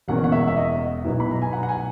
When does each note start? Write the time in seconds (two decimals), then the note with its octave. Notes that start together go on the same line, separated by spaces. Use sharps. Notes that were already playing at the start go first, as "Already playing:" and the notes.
0.08 E1 E2 B2 A#3 C#4 F#5
0.24 F#5
0.32 E5
0.48 E5
0.57 D#5
1.05 B1 B2 F#3 B3 E4
1.20 B5
1.31 A#5
1.42 G#5
1.53 F#5
1.63 F#5
1.69 G#5